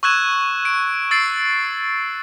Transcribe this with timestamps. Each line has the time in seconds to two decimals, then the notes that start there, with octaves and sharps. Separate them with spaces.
0.03 C#6 E6 F#6 G#6 E7
0.65 D7
1.11 E6 A6 C7 D7